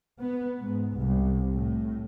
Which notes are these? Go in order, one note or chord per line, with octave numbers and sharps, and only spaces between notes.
B3
G#2
C2
A2